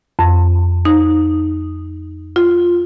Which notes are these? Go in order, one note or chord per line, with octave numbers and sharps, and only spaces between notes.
F2
D#4
F4